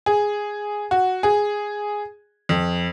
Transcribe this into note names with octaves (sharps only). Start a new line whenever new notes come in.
G#4
F#4
G#4
F2